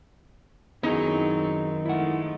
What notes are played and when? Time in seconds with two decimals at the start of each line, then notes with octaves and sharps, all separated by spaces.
0.83 F#2 D#3 F#3 B3 C4 D#4 E4 G#4
1.86 F3 G#3 A3 E4 F#5